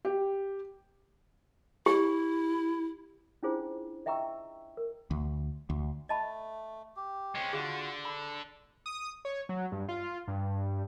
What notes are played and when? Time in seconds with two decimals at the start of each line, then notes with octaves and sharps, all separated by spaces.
0.05 G4
1.86 E4 G4
3.43 C#4 D4 E4 F4 G#4 C5
4.06 D#5 E5 G5 A#5 C#6 E6
4.77 A#4
5.11 D2
5.70 D2
6.09 A3 D#5 A5 B5
6.96 G4
7.35 G#3 C4 C#4
7.53 D3 F4 F#4 G#4
8.05 A4 B5
8.86 D#6
9.25 C#5
9.49 F#3
9.72 G2
9.89 F4
10.28 G2